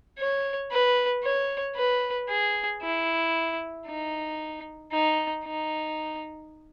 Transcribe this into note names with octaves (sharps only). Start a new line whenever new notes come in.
C#5
B4
C#5
B4
G#4
E4
D#4
D#4
D#4